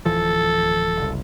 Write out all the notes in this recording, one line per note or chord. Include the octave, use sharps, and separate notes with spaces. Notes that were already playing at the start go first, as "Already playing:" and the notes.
D1 E3 F3 A4
F#1 C2